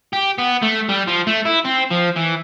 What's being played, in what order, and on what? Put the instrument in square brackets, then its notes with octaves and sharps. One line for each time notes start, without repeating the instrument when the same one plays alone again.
[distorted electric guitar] G4
B3
A3
G3
F3
A3
E4
C4
F3
E3